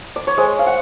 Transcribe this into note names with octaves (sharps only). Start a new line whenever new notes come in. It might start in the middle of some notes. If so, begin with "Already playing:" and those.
D5
C#5
G#3 C5
F5
F#5